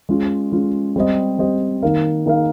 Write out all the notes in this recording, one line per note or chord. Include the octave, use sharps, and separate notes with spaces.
G#3 C#4 F4
G#3 C#4 F4
G3 C4 G4 C5 D#5
G3 C4 G4 C5 D#5
D#3 A#3 D#4 A#4 F5
D#3 A#3 D#4 A#4 F5